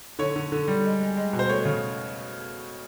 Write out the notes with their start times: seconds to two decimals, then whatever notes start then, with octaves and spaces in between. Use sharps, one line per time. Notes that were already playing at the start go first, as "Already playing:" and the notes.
0.19 D3 C#5
0.36 D3
0.52 D3
0.68 G3
0.85 G#3
1.00 G#3
1.16 G#3
1.33 B2
1.39 C5
1.49 A3 C#5
1.65 C#3